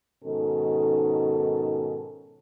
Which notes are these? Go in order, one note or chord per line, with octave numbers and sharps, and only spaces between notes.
G#2 B2 D#3 C#4 A4